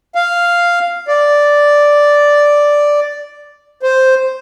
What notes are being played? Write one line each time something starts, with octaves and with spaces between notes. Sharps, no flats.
F5
D5
C5